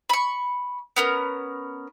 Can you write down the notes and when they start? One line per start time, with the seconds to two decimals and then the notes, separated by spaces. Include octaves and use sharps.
0.09 B5 C#6
0.96 B3 C#4 A#4